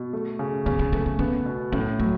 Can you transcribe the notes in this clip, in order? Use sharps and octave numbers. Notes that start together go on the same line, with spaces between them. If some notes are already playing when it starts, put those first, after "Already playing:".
Already playing: B2
A3
C#3
C#3 B3
B3
A3 B3
B3
B3 C#4
B2
A2 C#4
F#3 A3